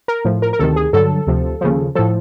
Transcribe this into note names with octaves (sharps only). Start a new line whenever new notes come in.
A#4
A2 F3
A#4
A#4
D2 C3 D#3 A4
G#4
G2 D3 F#3 A4
D2 C3 F3
D#2 C#3 F3
A2 F3 A4